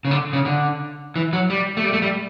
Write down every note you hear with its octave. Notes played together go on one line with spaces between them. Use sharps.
C#3
D3
C#3
D3
E3
F#3
G3
A3
G3
A3
G3